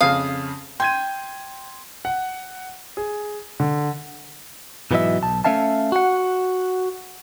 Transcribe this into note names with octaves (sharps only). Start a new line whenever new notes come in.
F2 C#3 F5 D#6
G5 C6 G#6 D#7
F#5
G#4
D3
G#2 B2 E3 F#3 D#5 E5
B1 A5
A3 A#3 C#4 E5 F5 A5
F#4 F#5